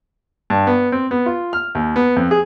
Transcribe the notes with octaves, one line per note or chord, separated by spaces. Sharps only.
G2
B3
C4
B3
F4
F6
D#2
B3
F2
G#4